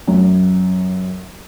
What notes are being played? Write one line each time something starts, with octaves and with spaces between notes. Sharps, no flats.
F#2